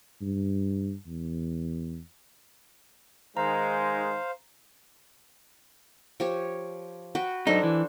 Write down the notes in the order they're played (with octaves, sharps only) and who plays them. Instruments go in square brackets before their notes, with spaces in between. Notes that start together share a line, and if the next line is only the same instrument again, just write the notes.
[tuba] G2
E2
[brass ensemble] D#3 G#3 D#4 [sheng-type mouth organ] C5 F5 [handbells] A#5
[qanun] F3 G4 C#5
F#4 B4 G5
[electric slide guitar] F#2 D#4 [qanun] D4 A4 C5
[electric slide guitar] E3